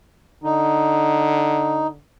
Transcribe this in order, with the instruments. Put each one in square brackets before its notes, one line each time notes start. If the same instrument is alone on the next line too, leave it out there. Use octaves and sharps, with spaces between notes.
[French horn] D3 [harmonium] D#4